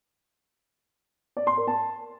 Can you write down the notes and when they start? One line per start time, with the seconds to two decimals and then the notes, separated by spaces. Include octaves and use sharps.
1.37 D5
1.47 C6
1.57 A#4
1.67 A5